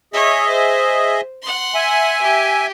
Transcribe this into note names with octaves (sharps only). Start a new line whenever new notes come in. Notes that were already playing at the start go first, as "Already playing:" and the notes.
G#4 C#5 D#5 E5
C5
F#5 C6
E5 G#5
G4